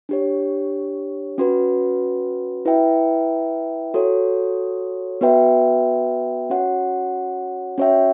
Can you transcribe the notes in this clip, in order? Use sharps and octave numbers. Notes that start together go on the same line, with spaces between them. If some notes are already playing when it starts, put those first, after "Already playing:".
D4 G4 C#5
C#4 F#4 B4
E4 B4 E5 G5
F#4 A4 C#5
B3 F#4 B4 E5 G5
C#4 F#4 C#5 F#5
C#4 F#4 C#5 E5 G5